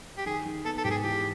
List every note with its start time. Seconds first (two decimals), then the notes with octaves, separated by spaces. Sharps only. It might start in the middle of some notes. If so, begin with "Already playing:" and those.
0.18 G4
0.26 D#3 G#4
0.46 D#3
0.65 B3 A4
0.78 A4
0.84 G#2 G4
0.91 G#4
1.03 E3 G4